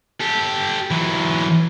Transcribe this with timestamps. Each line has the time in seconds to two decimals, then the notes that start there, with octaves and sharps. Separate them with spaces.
0.21 G4 A4
0.91 E3 F#3